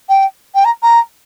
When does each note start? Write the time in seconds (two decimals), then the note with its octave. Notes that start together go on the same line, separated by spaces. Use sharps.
0.09 G5
0.54 G5
0.64 A#5
0.82 A#5